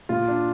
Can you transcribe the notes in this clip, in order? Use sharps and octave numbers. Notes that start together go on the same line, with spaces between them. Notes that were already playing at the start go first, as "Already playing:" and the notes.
A#2 F4
D4